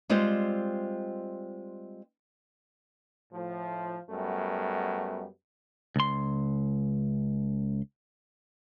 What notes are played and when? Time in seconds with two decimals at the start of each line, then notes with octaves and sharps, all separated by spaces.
0.09 G3 G#3 C4 F4 C5
3.33 A2 F3
4.10 F#2 G3 A3 B3
5.96 C#2 C6